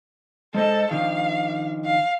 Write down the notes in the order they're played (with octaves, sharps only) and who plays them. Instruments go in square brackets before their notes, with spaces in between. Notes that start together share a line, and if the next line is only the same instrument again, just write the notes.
[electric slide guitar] G#3 C5 D#5 [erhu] A4
[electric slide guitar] D#3 F3 D4 [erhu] F5
[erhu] F5